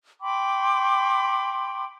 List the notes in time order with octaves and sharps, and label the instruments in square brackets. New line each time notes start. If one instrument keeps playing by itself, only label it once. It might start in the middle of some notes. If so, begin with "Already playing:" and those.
[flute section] G5 B5 C6 D6